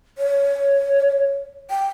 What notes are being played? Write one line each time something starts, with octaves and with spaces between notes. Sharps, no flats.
C#5
G5